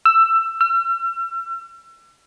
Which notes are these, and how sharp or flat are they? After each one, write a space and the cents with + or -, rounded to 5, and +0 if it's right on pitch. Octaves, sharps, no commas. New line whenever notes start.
E6 +15
E6 +40